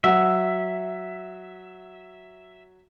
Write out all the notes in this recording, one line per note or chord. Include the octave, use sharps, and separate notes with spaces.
F#3 E5 F#5